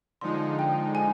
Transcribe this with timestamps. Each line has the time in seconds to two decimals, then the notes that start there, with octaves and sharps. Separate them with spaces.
0.21 D3 F3 G#3 D#4 C6
0.59 G5
0.95 G#5